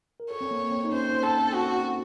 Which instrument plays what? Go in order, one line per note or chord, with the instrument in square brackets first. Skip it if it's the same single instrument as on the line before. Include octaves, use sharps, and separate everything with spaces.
[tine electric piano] A#4
[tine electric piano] A4 [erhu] C#5
[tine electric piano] C4
A#3
C4
D#4
[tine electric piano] C#4 [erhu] C5
[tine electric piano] C4 [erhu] A4
[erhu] F#4